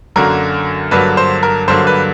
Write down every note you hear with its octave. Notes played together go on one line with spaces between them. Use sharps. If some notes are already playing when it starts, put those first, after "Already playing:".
F#2 D3 F#3 A#3 A#4
G2 D3 F#3 A#3 B4
C5
A#4
G2 D3 F#3 A#3 C5
B4